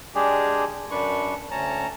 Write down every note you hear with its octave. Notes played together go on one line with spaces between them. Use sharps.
G#3 D4 G4 G#4
F#2 D4 B4 C#6
D2 C#4 A5 A#5